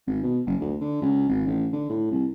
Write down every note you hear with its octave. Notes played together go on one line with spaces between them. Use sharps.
G#1
B2
F#1
D2
D3
C#2
G#1
A1
D3
A2
C2